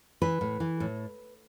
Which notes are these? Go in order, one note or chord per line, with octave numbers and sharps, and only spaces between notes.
E3 B4
A2
E3
A2